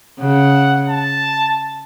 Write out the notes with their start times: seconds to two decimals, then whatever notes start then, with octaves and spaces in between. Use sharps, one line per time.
0.19 C#3 F#5
0.89 A5